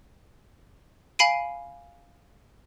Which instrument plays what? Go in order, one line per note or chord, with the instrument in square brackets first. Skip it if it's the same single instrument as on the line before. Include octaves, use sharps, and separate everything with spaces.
[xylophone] F5 G#5 B5 C7 D7 D#7